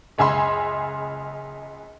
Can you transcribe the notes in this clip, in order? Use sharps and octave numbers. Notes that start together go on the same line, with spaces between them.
F#1 C#2 G#4 E5 B5 C6